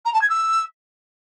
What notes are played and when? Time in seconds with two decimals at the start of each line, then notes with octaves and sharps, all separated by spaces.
0.05 A#5
0.13 A5
0.21 G#6
0.29 E6